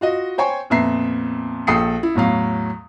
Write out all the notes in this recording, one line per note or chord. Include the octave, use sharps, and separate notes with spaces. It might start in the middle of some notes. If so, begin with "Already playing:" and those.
F4 F#4 D#5
C5 C#5 G5 G#5 C#6
F2 A#2 B3 E5 A#5 C7
A#1 A4 G5 D#6 C7 C#7
E4
E2 A2 F#3 F5